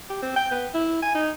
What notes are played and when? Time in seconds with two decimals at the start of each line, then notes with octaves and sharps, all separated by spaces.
0.10 G4
0.22 C4
0.36 G5
0.51 B3
0.74 E4
1.02 G#5
1.15 D#4